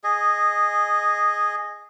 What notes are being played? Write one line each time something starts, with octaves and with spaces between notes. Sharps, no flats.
G#4 D#5